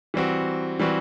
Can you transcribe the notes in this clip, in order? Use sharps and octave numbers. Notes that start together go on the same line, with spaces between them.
E3 G3 C4 F#4
E3 G3 C4 F#4